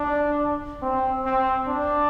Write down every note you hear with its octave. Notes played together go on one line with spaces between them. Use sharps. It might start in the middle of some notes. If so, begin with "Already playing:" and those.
Already playing: D4
C4
C4
D4